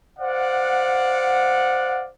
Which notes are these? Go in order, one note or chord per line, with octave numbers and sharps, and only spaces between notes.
C5 D5 F5 F#5